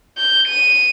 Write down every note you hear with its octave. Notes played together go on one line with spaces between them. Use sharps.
G6
D#7